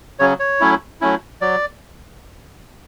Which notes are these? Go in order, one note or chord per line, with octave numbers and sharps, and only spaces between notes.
C#3 F#3 C#4 C#5
C#5
F#3 A3 C#4 E4
F#3 A3 C#4 E4
F#3 D5